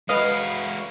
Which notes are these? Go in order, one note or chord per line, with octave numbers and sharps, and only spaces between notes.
G#3 F#4 B4 D#5 F5